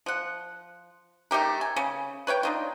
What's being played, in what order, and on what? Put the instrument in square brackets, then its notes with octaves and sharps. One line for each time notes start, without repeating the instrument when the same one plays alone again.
[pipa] F3 F#5
A3 D#4 G4 A#4
G#5
C#3
B4 C#5 F5 G5
D4 D#4 F4